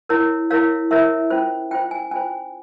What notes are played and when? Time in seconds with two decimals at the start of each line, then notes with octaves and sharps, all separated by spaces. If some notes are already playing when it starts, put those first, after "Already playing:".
0.09 E4 A#4 C#5
0.50 E4 A#4 C#5 F5
0.91 E4 A#4 C#5 E5
1.30 C#4 F4 C5
1.71 C#4 F4 C5 G5
1.91 G#5
2.11 C#4 F4 C5 G#5